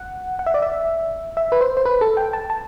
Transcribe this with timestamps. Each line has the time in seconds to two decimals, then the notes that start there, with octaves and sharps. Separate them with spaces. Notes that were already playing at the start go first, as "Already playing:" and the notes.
Already playing: F#5
0.39 F#5
0.46 E5
0.54 D5
0.62 E5
1.37 E5
1.52 B4
1.61 C5
1.77 C5
1.85 B4
2.01 A4
2.17 G5
2.33 A5
2.50 A5